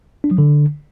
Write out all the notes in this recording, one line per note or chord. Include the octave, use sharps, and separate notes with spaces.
D4
F#3
D3